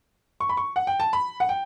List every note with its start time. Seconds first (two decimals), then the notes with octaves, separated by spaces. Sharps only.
0.40 C#6
0.49 B5
0.57 C#6
0.76 F#5
0.87 G5
1.00 A5
1.13 B5
1.40 F#5
1.49 G5